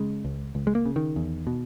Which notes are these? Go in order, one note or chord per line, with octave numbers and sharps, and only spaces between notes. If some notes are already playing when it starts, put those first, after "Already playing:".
Already playing: C#3 G#3
C#2
C#2
G#3
A#3
C#3
D#3
E2
B2